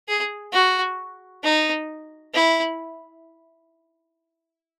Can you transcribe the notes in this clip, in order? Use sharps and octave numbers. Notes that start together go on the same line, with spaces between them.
G#4
F#4
D#4
E4